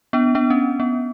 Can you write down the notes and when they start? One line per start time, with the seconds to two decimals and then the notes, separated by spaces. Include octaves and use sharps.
0.13 B3 D4
0.35 B3 D4
0.50 C#4
0.80 B3